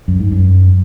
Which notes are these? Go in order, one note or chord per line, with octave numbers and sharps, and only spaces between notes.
F#2
G#2
F#2